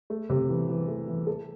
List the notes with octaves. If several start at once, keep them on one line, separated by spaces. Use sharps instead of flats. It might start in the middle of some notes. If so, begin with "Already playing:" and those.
A3
C3
E3
E3
A3
E3
A4